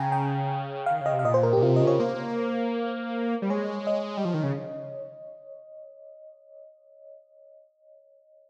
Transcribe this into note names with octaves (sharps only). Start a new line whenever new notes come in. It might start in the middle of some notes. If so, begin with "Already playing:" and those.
Already playing: C#3 G5 G#5 A#5
G5
D#3 F5
C#3 D#5
C3
F5
A#2 D#5
C5
A#4
G4
A#2
C3 F4
C#3 D#5
C#5
A#3 C5
G3
G#3 C#5
D#5
G3
F3
D#3
C#3